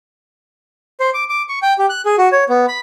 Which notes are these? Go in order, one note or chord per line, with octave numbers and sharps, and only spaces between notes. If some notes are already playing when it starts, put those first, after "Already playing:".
C5
D6
D6
C#6
G5
G4
F#6
G#4
F#4
C#5
B3
B5